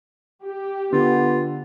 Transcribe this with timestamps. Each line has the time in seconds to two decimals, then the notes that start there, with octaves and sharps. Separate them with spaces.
0.44 G4
0.93 D3 B3 F4